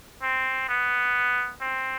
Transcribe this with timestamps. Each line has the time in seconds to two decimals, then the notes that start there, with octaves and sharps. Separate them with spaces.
0.22 C4
0.69 B3
1.61 C4